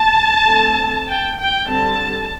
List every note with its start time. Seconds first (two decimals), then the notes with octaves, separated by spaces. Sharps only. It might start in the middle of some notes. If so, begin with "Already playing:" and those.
Already playing: A5
0.45 D3 A3 C4
1.07 G5
1.38 G5
1.68 D3 G3 C4 A5